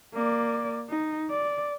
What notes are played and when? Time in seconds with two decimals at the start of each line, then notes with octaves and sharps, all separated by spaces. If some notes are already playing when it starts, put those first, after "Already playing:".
0.14 A#3 D5
0.90 D#4
1.31 D5